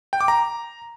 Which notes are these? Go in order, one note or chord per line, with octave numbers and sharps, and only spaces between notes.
G5
D6
A#5